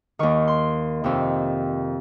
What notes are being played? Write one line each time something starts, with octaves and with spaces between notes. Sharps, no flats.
D#2 D#3 C#6
C6
F2 C3 D#3